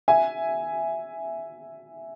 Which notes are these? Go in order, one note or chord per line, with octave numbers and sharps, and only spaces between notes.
E5 G#5